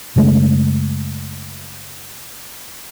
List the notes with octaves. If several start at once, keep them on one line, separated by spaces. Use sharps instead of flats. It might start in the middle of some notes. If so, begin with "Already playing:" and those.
F#2 C#3 G#3 A3